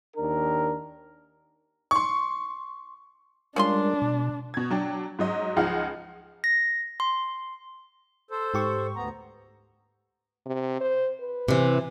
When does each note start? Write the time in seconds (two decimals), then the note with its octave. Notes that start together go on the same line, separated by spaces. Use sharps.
0.16 D#2 D4 A#4
1.91 C6 C#6
3.56 G3 G#3 C#4 D4 F4 A#4 C6
4.02 B2
4.54 B2 G#6
4.70 F#3 D4 G5
5.19 G#2 F#3 D#5
5.56 C#2 F3 D#4 G#4 F#5 F6
6.44 A#6
7.00 C6
8.31 A4 C5
8.54 G#2 G4 C#6
8.96 D2 B3 A#5
10.46 C3
10.81 C5
11.20 B4
11.48 C3 E3